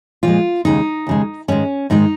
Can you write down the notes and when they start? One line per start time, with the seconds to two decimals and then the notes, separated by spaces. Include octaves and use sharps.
0.23 A#2 F3 G#3 F4
0.65 D#2 C#3 G#3 D#4
1.07 D#2 C#3 G#3
1.48 G#2 D#3 G#3 C#4
1.90 G#2 D#3 G#3 D#4